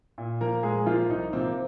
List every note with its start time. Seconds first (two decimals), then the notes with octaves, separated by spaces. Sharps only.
0.18 A#2
0.41 F3 A#3 A#4
0.63 A#2 G#3 G#4
0.86 F3 A#3 F4
1.09 C2 D#4
1.33 C3 F3 A#3 C4